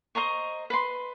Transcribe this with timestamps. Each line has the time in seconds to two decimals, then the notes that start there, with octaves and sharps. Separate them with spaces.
0.15 C5 D#5 A#5 C#6
0.70 B4 B5 C6